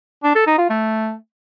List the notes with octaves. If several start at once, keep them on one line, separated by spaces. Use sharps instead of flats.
D4
A4
D#4
F4
A3